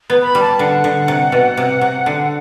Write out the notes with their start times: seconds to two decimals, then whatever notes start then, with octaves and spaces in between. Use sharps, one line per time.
0.10 B3
0.22 B5
0.35 G3
0.41 A5
0.59 D3 F#5
0.84 D3
1.08 C3
1.32 B2
1.57 C3
1.81 C3
2.06 D3